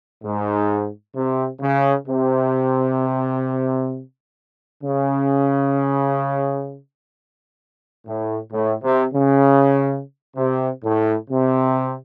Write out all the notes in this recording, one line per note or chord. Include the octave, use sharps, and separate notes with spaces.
G#2
C3
C#3
C3
C#3
A2
A2
C3
C#3
C3
A2
C3